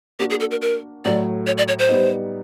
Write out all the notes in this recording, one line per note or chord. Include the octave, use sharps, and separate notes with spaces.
A#3 D4 F#4 G4
G#4
A4
A#4
A#4
A2 F#3 A3 D5
C#5
D5
C#5
C5
G3 B3 D#4